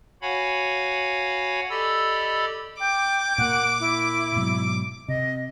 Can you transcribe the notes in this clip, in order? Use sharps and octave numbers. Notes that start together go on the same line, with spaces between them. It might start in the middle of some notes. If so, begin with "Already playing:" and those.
F#4 C#5 F5 F#5 G#5 B5
G4 A4 D5 D#5 B5 E6
G5 D6
A#2 A#3 F#5
E4
G#2 B2 F#3
C3 D#5